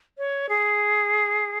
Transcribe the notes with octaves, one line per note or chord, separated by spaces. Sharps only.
C#5
G#4